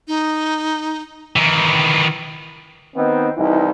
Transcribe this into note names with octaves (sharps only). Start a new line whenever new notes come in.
D#4
D#3 E3
D#3 B3 C4 D#4
C2 E3 D#4